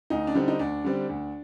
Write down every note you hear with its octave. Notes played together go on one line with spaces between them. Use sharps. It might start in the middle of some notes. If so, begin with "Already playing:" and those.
D2 D#4
D4
D3 G3 C4 D#4
D#4
D2 D4
D3 G3 C4
D2